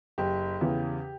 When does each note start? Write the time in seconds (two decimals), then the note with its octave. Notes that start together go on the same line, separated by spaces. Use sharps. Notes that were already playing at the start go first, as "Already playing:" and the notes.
0.18 F#1 G4
0.61 E2 C#3 E3